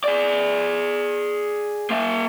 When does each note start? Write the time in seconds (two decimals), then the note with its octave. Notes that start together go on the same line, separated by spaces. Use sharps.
0.04 G#4 D5
1.90 A#3 E5